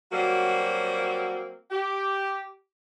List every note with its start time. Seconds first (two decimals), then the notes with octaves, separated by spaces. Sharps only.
0.11 F#3 G3 A#3 C4 F#4
1.71 G4